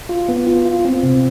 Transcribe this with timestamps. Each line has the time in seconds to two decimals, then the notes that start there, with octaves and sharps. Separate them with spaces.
0.09 F4
0.29 B3
0.47 F4
0.65 F4
0.85 C4
1.03 C3